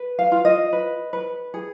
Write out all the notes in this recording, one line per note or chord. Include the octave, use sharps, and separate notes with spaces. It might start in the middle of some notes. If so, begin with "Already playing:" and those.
Already playing: B4
F5
F4
D#5
B4
B4
G#4